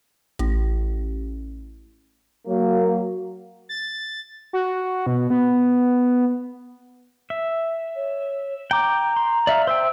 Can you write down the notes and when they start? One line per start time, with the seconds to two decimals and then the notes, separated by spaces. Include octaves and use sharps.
0.39 A1
2.47 F#3 A#3
3.69 A6
4.53 F#4
5.07 B2
5.30 B3
7.30 E5
7.96 C#5
8.71 G5 A#5 D6
9.16 C6
9.47 D5 E5 F5
9.67 C5 E5 G5 E6